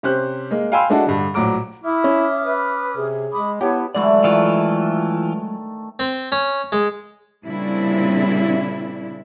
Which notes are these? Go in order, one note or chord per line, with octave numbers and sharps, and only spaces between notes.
C3 C#4 G4 C5 F#6
G#3 A#3
F5 G5 G#5 B5 C6 E6
G#3 A3 D4 E4 F#4
G2 D3
A#1 A2 F#3 A#5 D6 D7
E4 E5 D6 D#6 F6
C#4
B4
C3 G#4
G#3 B5 D6 D#6
B3 E4 G4 C#5 A5
D3 E3 F#3 G#3 A3 D5
D#3 E3 A3 F4
C4
C#4
G#3
A#2 C#3 G3 C4 D4 E4